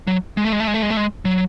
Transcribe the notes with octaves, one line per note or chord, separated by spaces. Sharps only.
F#3
G#3
A3
G#3
A3
G#3
A3
G#3
A3
G#3
F#3